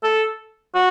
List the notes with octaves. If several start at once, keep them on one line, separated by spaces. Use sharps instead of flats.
A4
F#4